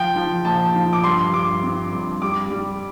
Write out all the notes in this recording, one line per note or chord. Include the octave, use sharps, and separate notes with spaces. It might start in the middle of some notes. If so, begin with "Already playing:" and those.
Already playing: F3 G5
F3
A#1 A5
F3
D6
G2 C6
G2 D6
C4
G2
G3 D6
G3